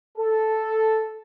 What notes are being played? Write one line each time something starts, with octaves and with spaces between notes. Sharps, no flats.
A4